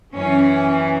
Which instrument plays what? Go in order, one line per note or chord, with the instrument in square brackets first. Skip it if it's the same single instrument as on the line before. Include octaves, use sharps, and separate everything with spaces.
[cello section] F#2 E3 C#4